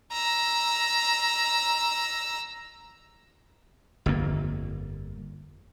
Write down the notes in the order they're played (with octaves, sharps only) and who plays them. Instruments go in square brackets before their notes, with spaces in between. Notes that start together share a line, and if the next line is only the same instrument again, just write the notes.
[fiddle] A#5 E6
[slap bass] G1 F2 A#3